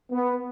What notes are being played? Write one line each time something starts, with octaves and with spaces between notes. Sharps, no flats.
B3